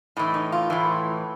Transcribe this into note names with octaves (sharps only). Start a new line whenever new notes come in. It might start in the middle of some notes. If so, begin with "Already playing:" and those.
A2 E3 D#4
D#4
F4
A2 E3